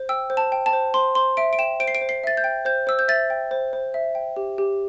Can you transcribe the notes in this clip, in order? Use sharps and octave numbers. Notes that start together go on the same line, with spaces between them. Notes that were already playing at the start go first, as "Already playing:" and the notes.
Already playing: C5
G5 E6
C5
A5
G5
A5
C5
C5 C6
C5 C6
E5 D7
D7
G5 E7
C5 D7
C7
D7
C5
C7
E5 A6
G6
G5
C5 G6
C5 E6
G6
E5 A6
G5
C5
C5
E5
G5
G4
G4